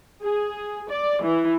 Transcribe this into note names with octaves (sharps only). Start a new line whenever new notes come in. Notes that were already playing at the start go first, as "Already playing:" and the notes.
G#4
D5
E3